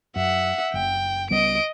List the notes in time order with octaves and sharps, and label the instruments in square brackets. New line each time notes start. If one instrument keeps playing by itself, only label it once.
[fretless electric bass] F#2 [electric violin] E5 F#5
[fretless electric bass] F#1 [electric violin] G5
[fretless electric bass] C#2 G3 B3 [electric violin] D#5 D7